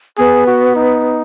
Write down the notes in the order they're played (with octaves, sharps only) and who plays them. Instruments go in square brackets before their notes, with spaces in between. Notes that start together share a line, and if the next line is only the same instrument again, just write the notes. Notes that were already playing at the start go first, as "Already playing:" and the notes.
[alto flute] B3 [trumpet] G#4
[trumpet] F#4
D#4